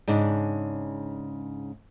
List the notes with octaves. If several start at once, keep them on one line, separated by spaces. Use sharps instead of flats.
G#2 C#3 D4